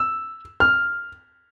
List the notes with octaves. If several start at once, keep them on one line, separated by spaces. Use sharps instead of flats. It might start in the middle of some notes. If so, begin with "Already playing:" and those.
Already playing: E6
F6